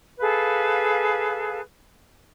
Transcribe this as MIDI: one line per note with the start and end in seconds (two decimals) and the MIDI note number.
0.20 1.60 68
0.20 1.60 69
0.20 1.60 71
0.20 1.60 77